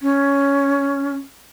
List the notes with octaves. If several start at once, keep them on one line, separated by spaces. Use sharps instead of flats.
C#4